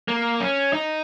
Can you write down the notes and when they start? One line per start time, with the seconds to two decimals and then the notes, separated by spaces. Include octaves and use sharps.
0.08 A#3
0.41 C#4
0.73 D#4